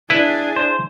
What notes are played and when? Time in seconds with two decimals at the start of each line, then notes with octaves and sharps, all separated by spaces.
0.10 D4 E4 G#4 B4
0.56 C5